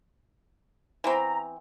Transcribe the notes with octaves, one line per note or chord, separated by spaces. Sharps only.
E3 B3 C4 A#5